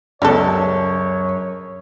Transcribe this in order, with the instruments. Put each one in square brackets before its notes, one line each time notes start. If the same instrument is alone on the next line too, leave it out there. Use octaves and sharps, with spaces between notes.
[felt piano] C#2 [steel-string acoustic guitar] F#2 [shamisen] G3 B3 A4 [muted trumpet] C#5